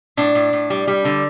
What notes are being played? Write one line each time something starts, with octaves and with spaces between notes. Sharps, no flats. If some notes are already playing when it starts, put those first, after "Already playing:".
A2 D4
A2
A2
G3
G3
D3